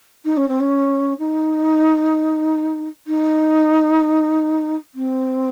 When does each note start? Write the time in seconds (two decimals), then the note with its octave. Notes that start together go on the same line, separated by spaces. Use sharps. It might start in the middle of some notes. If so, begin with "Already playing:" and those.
0.25 D#4
0.37 C#4
0.48 C4
0.60 C#4
1.19 D#4
3.07 D#4
4.95 C4